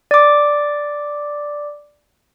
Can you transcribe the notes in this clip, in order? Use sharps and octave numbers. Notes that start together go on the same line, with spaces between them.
D5 D6